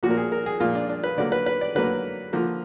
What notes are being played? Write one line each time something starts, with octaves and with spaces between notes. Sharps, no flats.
A#2 F3 A#3 F#4
A#4
G#4
A#4
G#4
A#2 F3 A#3 F4
D4
D4
B4
D3 F#3 A#3 D5
B4
B4
D5
D3 F#3 A#3 B4
D3 F3 A#3